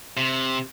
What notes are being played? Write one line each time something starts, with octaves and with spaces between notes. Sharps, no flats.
C3